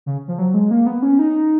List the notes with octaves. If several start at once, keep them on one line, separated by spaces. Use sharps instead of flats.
C#3
F3
F#3
G#3
A#3
B3
C#4
D#4